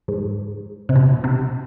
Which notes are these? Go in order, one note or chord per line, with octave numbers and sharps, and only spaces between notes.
G#2
C3
B2
C3